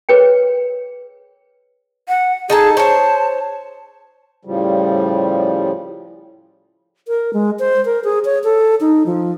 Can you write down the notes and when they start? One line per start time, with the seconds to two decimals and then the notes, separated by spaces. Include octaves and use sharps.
0.09 G#4 A#4 B4 C#5 G5
2.08 F#5
2.50 D#4 G#4 A4 A5
2.77 C5 C#5 A5
4.45 A2 C#3 F3 G3
7.08 A#4
7.33 G#3
7.59 C5
7.85 A#4
8.04 G#4
8.25 C#5
8.44 A4
8.81 D#4
9.06 F3